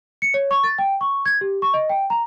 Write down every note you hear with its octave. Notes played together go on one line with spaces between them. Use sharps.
C#7
C#5
C#6
A6
G5
C#6
G#6
G4
C#6
D#5
G5
A#5